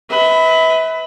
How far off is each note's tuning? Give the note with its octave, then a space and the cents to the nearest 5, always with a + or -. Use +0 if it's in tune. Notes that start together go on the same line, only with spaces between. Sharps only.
B4 +15 E5 -35